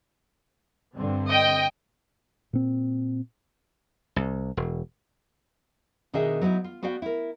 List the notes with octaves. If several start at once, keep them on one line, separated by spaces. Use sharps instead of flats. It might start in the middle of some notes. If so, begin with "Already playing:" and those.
G2 D3 C4
D#5 G5
A#2 C4
C2
E1
B2 D#3 D4 D#4 G#4 E5
F#3 B3 D#4 E4
F4
B3 F#4 D5 F5 G5
E4 A#4